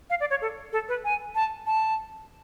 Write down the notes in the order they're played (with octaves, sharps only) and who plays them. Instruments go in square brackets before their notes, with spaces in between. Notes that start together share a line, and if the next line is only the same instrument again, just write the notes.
[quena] F5
D5
C#5
A4
A4
B4
G#5
A5
A5